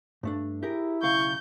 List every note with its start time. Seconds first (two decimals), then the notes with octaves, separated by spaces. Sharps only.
0.23 G2 A3 D4
0.63 E4 G4 G#4 A#4
1.03 B1 C#3 F5 C#6 G6